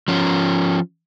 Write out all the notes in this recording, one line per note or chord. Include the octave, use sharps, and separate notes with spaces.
F3 C#4